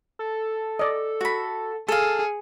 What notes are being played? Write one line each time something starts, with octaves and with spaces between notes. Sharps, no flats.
A4
D5 D#5
F#4 B5
G#4 A4 F5